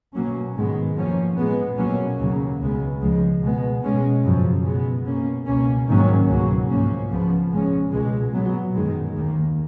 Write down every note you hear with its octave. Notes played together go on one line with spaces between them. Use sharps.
B2 F#3 A#3 C#4
G#2 D#3 G#3 B3
F#2 F3 A#3 C#4
A#2 G#3 B3
B2 F#3 A#3 C#4
D#2 C#3 F#3 A#3
C#2 C#3 G#3 B3
C#2 C#3 F3 G#3
B2 G#3 B3
B2 G#3 C#4
F#2 C#3 F3
B2 G#3 B3
B2 A#3 C#4
C#2 B2 A#3 C#4
G#2 D#3 F#3 A#3 C#4
C#2 B2 F#3 A#3 C#4
G#2 F3 A#3 C#4
C#2 C#3 F3 B3
A#2 G#3 C#4
C#2 B2 G#3
A#2 F#3 B3
F#2 D#3 G#3
D#2 D#3 A#3